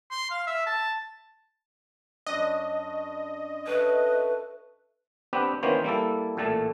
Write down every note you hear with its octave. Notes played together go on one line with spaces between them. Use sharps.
C6
F5
E5
A5
F#2 D4 D#5
A4 B4 C#5 E5
B3 C4 D4 G4 B4
D#3 E3 A#3 B3 C#4 C5
G3 A#3 E4 A4
A1 A#2 A3 A4 A5